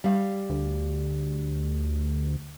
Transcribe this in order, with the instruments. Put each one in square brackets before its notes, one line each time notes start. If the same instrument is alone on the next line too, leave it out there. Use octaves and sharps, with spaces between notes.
[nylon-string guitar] G3 F5
[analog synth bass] D2